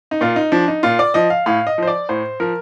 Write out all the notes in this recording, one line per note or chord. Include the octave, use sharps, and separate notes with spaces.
D#4
A#2 F4
D#4
F3 D4
D#4
A#2 F4
D5
F3 D#5
F5
A2 F5
D#5
F3 C5
D5
A2 C5
F3 A#4